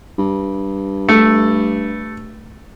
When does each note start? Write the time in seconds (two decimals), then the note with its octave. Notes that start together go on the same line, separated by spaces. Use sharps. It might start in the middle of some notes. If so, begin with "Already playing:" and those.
0.19 G2
1.09 A3